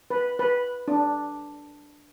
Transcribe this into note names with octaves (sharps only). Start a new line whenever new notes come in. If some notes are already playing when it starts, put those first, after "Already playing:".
B4
B4
D4